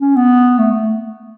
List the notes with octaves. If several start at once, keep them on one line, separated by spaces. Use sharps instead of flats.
C#4
B3
A3
A3